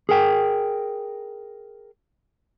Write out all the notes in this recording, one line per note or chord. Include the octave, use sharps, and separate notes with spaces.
G#4 A#4 G5